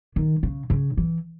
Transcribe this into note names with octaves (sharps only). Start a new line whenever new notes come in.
D#3
C#3
C#3
E3